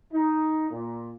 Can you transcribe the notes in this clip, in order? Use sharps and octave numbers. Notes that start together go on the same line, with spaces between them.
D#4
A#2